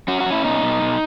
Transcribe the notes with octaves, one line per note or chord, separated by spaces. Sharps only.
C#4 F#4
F#4
C#4
E4
B2 D#4
B2
B2